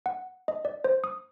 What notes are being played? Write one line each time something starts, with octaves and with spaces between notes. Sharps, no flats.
F#5
D#5
D5
C5
D#6